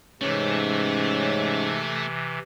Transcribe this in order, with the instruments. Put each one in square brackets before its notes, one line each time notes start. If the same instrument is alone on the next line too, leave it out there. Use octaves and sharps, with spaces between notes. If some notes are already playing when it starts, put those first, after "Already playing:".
[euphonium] G#2 [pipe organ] C3 E3 [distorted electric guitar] A3 [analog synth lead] C#4